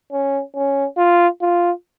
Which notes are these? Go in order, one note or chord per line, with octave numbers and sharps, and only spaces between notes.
C#4
C#4
F4
F4